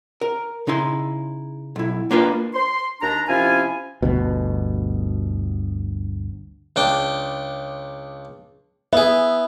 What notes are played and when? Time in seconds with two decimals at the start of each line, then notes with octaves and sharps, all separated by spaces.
0.21 A#4
0.67 C#3 D#4 E4 C6
1.76 B1 E4
2.11 A#3 D4 F4 A#4 B4 G5
2.54 C6
3.02 D#2 D4 A#5
3.28 C3 F3 C#4 E4 F4 G#5
4.02 G1 D2 B2
6.76 C#2 D4 G5
8.93 B3 G#4 E5